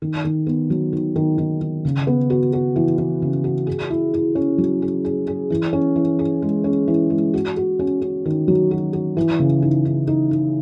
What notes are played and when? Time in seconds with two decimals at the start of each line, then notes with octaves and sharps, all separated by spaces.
0.02 D#3
0.24 D#3
0.47 B3
0.70 F#3
0.93 D#3
1.16 D#3
1.38 D#3
1.61 D#3
1.85 C#3
2.07 B3
2.30 F#4
2.53 F#4
2.76 E3
2.98 E3
3.22 C#3
3.44 F#4
3.67 G#4
3.90 E4
4.14 E4
4.35 C#4
4.58 F#3
4.82 G#4
5.05 G#4
5.27 G#4
5.50 E3
5.73 C#4
5.96 E3
6.19 G#4
6.42 G#3
6.64 C#4
6.88 E3
7.10 G#3
7.34 F#4
7.57 F#4
7.79 C#4
8.01 C#4
8.25 D#3
8.48 F#3
8.71 F#4
8.93 F#4
9.17 E3
9.39 C#3
9.62 D#4
9.85 D#4
10.07 D#4
10.31 D#4